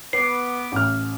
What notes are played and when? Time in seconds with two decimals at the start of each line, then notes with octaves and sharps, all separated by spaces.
0.13 B3 B4 D6 C7
0.72 A1 F6